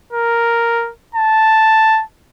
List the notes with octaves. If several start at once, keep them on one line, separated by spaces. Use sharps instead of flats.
A#4
A5